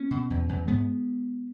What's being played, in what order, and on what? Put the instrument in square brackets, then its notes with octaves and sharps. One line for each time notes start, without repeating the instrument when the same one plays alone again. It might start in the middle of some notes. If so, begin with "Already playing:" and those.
Already playing: [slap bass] A#3 C#4
B2
E2
E2
G#2 G#3 B3